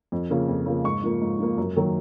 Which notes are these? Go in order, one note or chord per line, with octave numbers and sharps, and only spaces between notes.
F2
C#3 F3 A#3
F2
C#3 F3 A#3
G#2 C#6
F3 A#3
G#2
F3 A#3
F#2
D#3 F#3 A#3